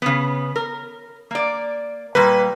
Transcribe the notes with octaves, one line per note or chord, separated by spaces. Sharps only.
C#3 B3
A#4
A#3 D5
A#2 G3 A#3 B4